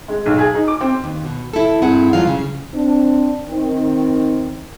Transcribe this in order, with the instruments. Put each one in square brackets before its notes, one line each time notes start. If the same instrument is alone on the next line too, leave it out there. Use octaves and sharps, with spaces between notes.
[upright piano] G#3
B1
G#4
D#4
D6
C4
[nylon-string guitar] D#2
B2
E4 A4
G2 C4 E4 G#4 F#5
F2 F#3 G#3 F4 F5
C#3
[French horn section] C4 D4
D#3 C4